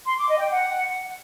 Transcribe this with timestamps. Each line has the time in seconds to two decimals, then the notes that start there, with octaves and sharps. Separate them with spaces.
0.05 C6
0.17 D6
0.28 D#5
0.39 G5
0.51 F#5